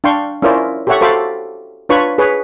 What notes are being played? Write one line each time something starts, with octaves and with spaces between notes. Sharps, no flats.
D4 F5 G5 C6 C#6
C#4 E4 F4 A#4 C5 D5
G4 A4 C#5 E5 F#5 C#6
F#4 A4 C5 F5 B5 D6
D4 F4 B4 C#5 B5 C#6
G#4 B4 C#5